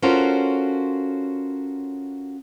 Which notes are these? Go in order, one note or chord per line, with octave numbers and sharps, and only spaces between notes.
C#4 F4 F#4 A4 A#4 C5